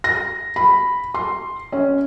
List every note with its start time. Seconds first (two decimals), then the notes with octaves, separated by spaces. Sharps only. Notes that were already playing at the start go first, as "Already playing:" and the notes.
0.04 A#6
0.56 B5
1.14 C6
1.72 C#4